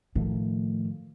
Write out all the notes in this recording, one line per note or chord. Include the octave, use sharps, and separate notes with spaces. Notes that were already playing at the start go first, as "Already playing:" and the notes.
A2 D#3 F3 A3